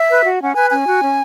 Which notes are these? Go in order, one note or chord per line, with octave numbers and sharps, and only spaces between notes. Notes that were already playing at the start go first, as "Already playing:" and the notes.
Already playing: E5
B4
F#4
C#4 F#5
B4 G#5
C#4 G#5
F#4
C#4